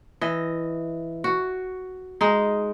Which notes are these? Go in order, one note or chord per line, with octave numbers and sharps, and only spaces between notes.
E3 D#5
F#4
G#3 D#4